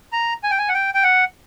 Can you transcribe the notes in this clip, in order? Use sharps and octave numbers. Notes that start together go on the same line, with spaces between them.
A#5
G#5
G5
G#5
F#5
G5
G5
F#5